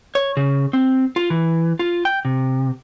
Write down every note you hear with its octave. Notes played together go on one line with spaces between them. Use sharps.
C#5
C#3
C4
F4
E3
F4
G5
C3